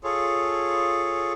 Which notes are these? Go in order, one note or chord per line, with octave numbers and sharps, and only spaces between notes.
F4 G#4 A4 C#5